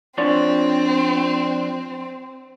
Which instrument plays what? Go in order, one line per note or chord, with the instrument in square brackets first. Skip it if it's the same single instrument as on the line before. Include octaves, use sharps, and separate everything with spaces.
[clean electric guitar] F3 D4 C#5 [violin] C4